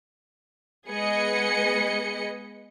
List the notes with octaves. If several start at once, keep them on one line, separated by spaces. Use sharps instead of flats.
G#3 B3 G#4 B4 D#5 C#7